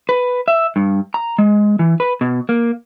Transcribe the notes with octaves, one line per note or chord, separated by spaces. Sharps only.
B4
E5
G2
A#5
G#3
E3
B4
B2
A#3